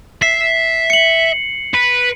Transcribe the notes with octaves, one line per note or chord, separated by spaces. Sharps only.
E5 C7
C#7 F#7
B4